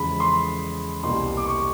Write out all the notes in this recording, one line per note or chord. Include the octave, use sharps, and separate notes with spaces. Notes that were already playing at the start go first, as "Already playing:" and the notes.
Already playing: E2 C#3 F3 G#3 B5
C6
C2 B2 G3 A#3 C6
D6
C#6